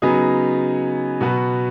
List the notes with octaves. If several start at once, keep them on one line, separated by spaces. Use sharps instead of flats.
C#3 F#3 B3 D#4 G#4
B2 F#3 B3 F#4